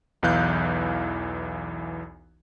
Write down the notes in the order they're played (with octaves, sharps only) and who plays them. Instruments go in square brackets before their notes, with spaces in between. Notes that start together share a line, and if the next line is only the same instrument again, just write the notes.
[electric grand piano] B1 E2 E3 F5 F#6 G6